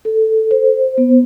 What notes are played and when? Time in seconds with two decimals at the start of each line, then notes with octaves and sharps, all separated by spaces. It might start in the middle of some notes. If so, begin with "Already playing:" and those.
0.05 A4
0.51 C5
0.98 B3